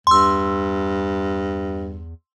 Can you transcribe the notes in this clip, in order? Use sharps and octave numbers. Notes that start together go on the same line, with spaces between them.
E2 G2 C6 E6